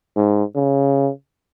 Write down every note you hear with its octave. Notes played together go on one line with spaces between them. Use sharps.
G#2
C#3